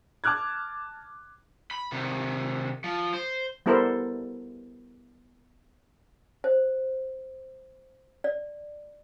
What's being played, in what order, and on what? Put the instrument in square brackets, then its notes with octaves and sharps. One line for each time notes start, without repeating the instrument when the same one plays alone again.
[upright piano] A5 D6 F6 F#6 G#6
[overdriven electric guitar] B5
C3 D#3
F3
C5
[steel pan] G3 B3 E4 A4 A#4 C5
[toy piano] C5
D5